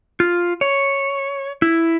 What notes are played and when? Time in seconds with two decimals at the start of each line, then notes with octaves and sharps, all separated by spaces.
0.20 F4
0.61 C#5
1.62 E4